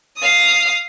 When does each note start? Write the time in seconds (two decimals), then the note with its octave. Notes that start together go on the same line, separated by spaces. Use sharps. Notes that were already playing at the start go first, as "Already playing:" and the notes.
0.18 F5 D#6